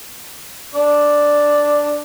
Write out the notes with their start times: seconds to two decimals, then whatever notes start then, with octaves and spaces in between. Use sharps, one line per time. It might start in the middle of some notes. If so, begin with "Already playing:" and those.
0.75 D4 D5